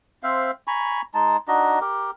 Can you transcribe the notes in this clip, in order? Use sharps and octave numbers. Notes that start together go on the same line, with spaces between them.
C4 C5 E5 F5
G#5 A#5 B5 C#6
G#3 D#4 A5
D4 D#4 F#4 D#5
G4 A#4